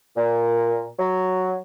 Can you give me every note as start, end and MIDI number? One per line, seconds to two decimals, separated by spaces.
0.16 0.86 46
0.99 1.59 54